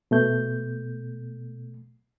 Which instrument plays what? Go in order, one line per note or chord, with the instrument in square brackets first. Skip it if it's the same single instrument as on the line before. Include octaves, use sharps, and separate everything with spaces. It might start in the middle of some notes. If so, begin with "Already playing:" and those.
[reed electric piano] B2 A3 G6